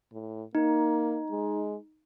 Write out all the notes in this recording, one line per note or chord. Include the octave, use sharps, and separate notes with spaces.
A2
A#3 D#4
G#3